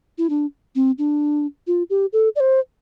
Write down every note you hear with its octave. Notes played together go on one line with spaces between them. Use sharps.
E4
D4
C4
D4
F4
G4
A4
D5
C5